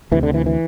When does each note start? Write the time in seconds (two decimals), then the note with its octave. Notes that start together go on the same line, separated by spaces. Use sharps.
0.12 D2 C3 E3
0.23 D3
0.34 E3
0.46 E3